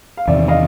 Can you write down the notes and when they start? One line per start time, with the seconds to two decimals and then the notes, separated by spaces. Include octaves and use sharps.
0.17 F5
0.27 E2 C3 D#3 D5 E5
0.48 D#5 F5